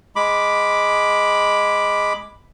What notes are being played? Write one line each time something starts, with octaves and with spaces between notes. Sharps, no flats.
G#3 B5 D6